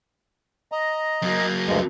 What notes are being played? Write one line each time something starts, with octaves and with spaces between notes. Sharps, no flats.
D#5 A#5
F#2 A#3
D2 G2 G#3